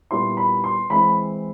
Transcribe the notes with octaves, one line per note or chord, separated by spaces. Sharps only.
A#2 G3 B3 E4 C6
B5
C6
E3 G#3 C4 E4 B5